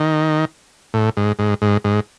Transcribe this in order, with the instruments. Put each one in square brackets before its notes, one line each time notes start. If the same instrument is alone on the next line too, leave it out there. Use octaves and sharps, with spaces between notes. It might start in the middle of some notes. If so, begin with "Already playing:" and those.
Already playing: [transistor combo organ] D#3
A2
G#2
G#2
G#2
G#2